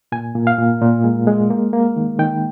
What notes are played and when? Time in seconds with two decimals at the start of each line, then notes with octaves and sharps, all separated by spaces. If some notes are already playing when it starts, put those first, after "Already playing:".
0.12 A#2 G#5
0.35 A#2
0.47 F5
0.58 A#2
0.81 A#2
1.04 G#3
1.27 G#3
1.50 A#3
1.73 A#3
1.96 D#3
2.19 D#3 G5